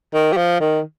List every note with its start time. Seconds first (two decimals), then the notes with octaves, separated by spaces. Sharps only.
0.14 D#3
0.33 G3
0.37 F3
0.60 D#3